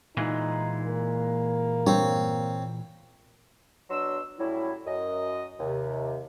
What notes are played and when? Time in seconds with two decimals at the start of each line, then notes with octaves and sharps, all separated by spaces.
0.17 A#2 E3 G#3 D#4
0.84 A#3
1.87 G2 C4 C#5
3.90 B2 F#3 D4 C6 E6
4.39 A2 F#3 G3 C#4 E4
4.86 F#2 D#5
5.60 D#2 C3